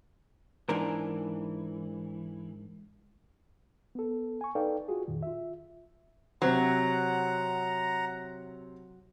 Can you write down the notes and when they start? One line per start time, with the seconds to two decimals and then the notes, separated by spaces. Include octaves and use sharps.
0.69 G#2 E3 D4 A#4
3.95 B3 A4
4.41 G#5 C#6
4.55 D#4 A4 B4 D5 F5 G5
4.88 F4 F#4 G#4
5.08 F2 A#2 D#3
5.23 F4 E5
6.42 C3 F#3 C4 C5 F#5 A#5